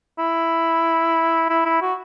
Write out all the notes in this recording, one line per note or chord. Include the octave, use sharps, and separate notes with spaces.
E4
E4
E4
F#4